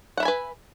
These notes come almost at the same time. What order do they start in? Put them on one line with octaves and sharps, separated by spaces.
F#5 E5 B5 G#5 B4